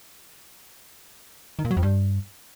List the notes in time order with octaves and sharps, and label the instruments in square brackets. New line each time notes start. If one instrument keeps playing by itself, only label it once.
[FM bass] D#3
A#2
F#3
F2
G2